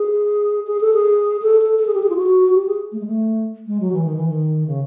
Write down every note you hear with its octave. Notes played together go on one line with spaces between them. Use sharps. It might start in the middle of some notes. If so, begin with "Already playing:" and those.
Already playing: G#4
G#4
A4
G#4
A4
A4
A4
G#4
G4
G#4
F4
F#4
G4
G#4
A3
G#3
A3
G#3
F#3
E3
D#3
E3
D#3
C#3